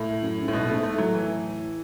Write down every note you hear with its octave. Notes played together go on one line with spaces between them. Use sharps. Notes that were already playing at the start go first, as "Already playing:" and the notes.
Already playing: A2
F#2
G#2
A2
F#2 B2
G#2 A3
A3
A2 F#3
E3